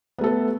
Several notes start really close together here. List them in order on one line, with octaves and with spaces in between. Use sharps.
B3 A3 A4 B4